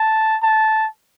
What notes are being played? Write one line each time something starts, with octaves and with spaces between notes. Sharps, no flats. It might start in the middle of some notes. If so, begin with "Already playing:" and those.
Already playing: A5
A5